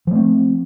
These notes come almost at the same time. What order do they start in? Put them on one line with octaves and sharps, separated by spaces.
F3 A3 C4